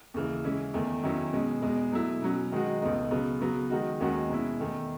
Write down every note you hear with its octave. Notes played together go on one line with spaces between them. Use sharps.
D#2 C#3 E3
C#3 E3 G#3 C#4 E4
E2 D#3 A3
E2 D#3 F#3 C#4 E4
B2 G#3 C#4
E2 B2 G#3
B2 F#3 A3 E4
B2 F#3 C#4
D#3 G#3 D#4 F#4
C#2 B2 A3 D#4
C#3 F#3 B3
C#3 F#3 B3
D#3 G#3 D#4 F#4
D#2 D#3 G#3 C#4 F#4
B2 G#3 C#4 E4
E2 D#3 A3